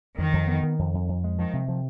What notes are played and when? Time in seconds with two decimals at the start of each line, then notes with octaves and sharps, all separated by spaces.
0.18 F2 D#3
0.33 F2
0.48 B3
0.63 D#3
0.79 F2
0.94 F2
1.09 F2
1.24 G#3
1.39 D#3 F3
1.53 C3
1.68 F3